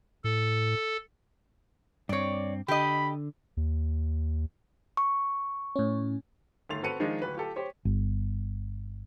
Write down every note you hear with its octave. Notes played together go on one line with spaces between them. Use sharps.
A2 A4
G2 C4 C#5 D5
D3 G4 D#5 B5
D#2
C#6
A2 C#4
G1 D#3 A3 C6 A6 F7
C4 F#4 A4 B4 C#7 D#7
D#3 F3 G#3 D4
D1 B4
F4 G4 A4
G4 C5 C#5
G1